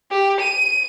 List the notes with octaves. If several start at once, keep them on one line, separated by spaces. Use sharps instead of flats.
G4
D#7